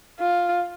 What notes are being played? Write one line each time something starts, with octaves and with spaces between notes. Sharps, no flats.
F4